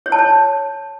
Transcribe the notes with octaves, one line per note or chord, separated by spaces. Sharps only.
C#5
A5
C#5